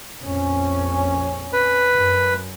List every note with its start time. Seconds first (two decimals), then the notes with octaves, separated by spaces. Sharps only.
0.23 A#1 F2 C#4
1.53 B4
1.94 F#2